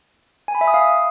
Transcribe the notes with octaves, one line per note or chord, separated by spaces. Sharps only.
G#5
B5
E5
D#6
F5